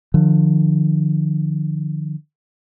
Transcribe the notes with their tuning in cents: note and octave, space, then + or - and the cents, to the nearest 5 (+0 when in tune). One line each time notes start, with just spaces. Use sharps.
D3 +45 F3 +0